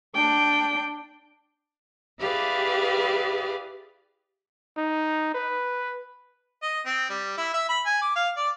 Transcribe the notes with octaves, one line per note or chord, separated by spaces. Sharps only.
D4 G5
E4 G4 G#4 B4 D5 F5
D#4
B4
D#5
C4
G3
E4
E5
B5
G#5
D6
F5
D5